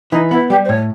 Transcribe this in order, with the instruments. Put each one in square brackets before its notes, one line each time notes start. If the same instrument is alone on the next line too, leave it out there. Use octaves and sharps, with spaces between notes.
[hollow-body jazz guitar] E3 [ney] D#4
[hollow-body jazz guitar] B3 [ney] E4
[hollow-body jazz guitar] G3 [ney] G4
[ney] C5
[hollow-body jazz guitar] A2 [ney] C#5